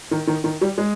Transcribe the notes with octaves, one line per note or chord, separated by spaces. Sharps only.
D#3
D#3
D#3
G3
G#3